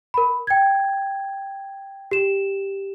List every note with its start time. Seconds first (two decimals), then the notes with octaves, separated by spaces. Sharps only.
0.14 A#4 B5
0.47 G5 G#6
2.11 G4 E7